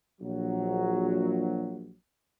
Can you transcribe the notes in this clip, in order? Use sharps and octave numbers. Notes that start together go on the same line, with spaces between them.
A#1 F#3